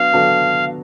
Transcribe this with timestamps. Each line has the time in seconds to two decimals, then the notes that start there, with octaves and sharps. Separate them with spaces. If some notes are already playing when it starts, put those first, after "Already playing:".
Already playing: F#3 B3 D4 F#4 F5
0.13 F#3 B3 D4 F#4 A4